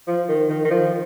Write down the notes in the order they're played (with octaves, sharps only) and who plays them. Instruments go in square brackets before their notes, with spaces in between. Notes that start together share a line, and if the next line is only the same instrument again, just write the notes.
[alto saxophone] F3
D#3
D#3
D#3
F3